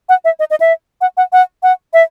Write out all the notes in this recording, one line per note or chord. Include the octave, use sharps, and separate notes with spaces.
F#5
E5
D#5
D#5
E5
F#5
F#5
F#5
F#5
E5